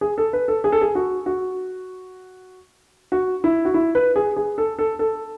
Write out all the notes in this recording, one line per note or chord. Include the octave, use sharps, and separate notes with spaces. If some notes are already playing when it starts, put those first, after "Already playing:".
G#4
A4
B4
A4
G#4
A4
G#4
F#4
F#4
F#4
E4
F#4
E4
B4
G#4
G#4
A4
A4
A4